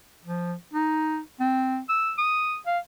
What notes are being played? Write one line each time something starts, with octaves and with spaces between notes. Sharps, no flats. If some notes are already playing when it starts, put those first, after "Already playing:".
F3
D#4
C4
E6
D#6
F5